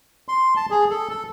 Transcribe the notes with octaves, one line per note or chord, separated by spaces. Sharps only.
C6
A5
G#4
A4
A4